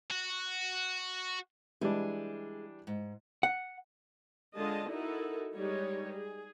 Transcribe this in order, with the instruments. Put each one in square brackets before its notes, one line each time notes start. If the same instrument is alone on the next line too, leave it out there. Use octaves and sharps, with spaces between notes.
[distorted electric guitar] F#4
[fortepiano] E3 G3 D4 [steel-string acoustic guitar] G#3
[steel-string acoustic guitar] G#2
[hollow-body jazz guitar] F#5
[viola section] D3 G#3 F4 D#5 A5
D#4 E4 F#4 A4 A#4
G3 G#3 D#4 C#5
G#4